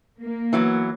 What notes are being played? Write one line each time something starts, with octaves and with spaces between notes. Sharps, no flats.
A#3
E3 F#3 B3